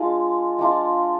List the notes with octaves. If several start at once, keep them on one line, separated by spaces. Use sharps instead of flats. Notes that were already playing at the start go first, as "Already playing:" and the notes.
Already playing: G#3 D4 F4
G#3 D4 F4